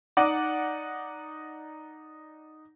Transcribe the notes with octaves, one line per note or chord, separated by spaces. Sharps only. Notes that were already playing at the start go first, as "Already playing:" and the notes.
D#4 D5 F#5 D6